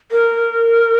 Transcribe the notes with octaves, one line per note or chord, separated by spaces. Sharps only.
A#4